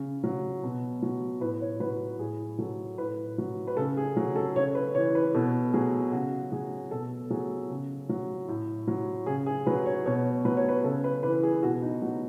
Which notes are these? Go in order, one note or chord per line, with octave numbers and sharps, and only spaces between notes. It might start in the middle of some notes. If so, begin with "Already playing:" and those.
Already playing: C#3
F#3
B2
F#3
A2 B4
C#5
F#3 B4
A2 G#4
F#3 A4
A2 B4
F#3
B4
C#3 A4
G#4
F#3
A4
C#3 C#5
B4
E3 C#5
B4
B2 A4
F#3 G#4
C#3 F#4
F#3 G#4
B2 A4
F#3 G#4
C#3
F#3
A2
F#3
C#3 G#4
G#4
F#3 B4
C#5
B2 C#5
F#3 B4
C#5
B4
C#3 A4
B4
E3 B4
G#4
B2 F#4
D#4
F#3 F#4